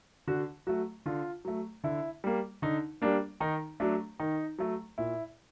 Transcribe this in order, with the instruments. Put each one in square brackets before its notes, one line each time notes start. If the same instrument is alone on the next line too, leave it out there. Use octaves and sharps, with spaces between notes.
[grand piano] D3 F#4
F#3 A3 F#4
D3 F4
F#3 A3
D3 E4
G3 A#3
D3 D#4
G3 A#3 D4
D#3 D#4
F#3 A3 D4
D#3 D#4
F#3 A3
A#2 E4